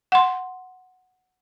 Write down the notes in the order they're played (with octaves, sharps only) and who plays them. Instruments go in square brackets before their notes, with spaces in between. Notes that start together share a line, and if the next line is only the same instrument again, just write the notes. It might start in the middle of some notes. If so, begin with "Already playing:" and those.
[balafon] F#5 C6